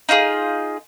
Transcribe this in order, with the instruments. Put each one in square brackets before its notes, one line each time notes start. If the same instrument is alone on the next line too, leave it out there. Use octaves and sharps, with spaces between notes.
[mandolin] D#4 F4 F#4 G#4